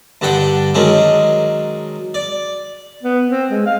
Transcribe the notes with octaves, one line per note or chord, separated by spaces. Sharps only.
G2 D3 D4 F#5 G5
D#3 F#3 G#3 C#4 D4
D5
B3
C4
G#3
F5